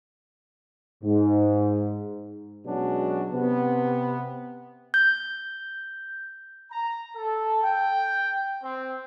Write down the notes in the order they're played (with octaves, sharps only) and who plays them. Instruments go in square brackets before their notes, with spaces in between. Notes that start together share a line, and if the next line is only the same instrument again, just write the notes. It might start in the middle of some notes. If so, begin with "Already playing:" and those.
[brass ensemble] G#2
[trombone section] B2 F#3 G#3 C#4 D4 F#4
C3 B3
[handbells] G6
[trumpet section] A#5
A4
G5
C4